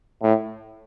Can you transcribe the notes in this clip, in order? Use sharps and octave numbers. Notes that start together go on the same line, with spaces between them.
A2